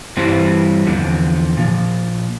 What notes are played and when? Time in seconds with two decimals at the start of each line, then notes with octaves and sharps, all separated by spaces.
0.17 G2 E3 G3 C4
0.87 E2 D3 F3
1.57 A#2 F3